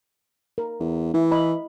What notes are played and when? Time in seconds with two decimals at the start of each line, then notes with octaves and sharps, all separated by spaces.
0.58 A#4
0.80 E2
1.14 E3 E4
1.32 D#5 B5